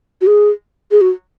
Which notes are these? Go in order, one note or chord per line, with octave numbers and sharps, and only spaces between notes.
F#4
G#4
G#4
F#4